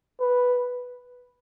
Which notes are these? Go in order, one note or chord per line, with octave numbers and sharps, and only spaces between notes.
B4